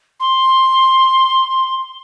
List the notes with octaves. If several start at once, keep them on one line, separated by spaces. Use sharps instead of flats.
C6